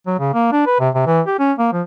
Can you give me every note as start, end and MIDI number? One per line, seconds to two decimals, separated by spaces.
0.07 0.16 54
0.19 0.30 49
0.34 0.51 58
0.52 0.62 62
0.67 0.75 71
0.80 0.89 48
0.94 1.05 48
1.06 1.21 52
1.27 1.37 67
1.39 1.53 61
1.59 1.69 58
1.73 1.82 53